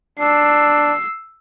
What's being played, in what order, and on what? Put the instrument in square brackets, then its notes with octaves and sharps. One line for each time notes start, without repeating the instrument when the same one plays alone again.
[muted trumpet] D4 [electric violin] E6 C7